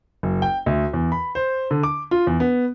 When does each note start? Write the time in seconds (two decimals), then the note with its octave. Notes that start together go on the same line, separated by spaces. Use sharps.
0.23 F#1
0.42 G5
0.66 D2
0.93 E2
1.12 B5
1.35 C5
1.71 D3
1.83 D6
2.11 F4
2.27 E2
2.40 B3